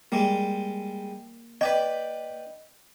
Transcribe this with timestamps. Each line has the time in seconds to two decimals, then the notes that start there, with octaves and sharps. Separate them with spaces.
0.12 G3 G#3 A#3
1.61 B4 D5 D#5 G5